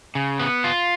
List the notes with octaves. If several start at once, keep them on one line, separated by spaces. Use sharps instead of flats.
C#3
B3
F4